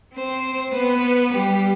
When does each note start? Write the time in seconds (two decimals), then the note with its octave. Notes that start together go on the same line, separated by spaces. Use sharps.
0.14 C4 C5
0.73 B3 B4
1.32 G3 G4